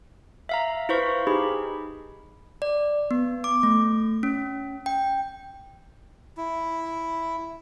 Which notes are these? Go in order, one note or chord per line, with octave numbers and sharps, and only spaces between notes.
E5 F5 A#5
E4 B4 C5 F5 C#6 B6
D#4 G4 G#4 B5
D5
B3
D6
A3
C#4
G5
E4